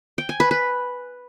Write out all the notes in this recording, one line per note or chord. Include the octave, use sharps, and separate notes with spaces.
G5
G#5
B4
B4